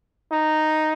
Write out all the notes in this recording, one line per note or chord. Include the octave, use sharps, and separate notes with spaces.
D#4